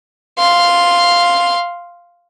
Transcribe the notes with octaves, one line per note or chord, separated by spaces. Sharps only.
F5 C6